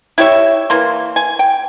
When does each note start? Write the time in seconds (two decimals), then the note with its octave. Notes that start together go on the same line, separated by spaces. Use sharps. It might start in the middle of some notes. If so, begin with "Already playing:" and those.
0.18 E4 G4 C#5 E5
0.70 E3 A#3 C6
1.16 G#5
1.39 G5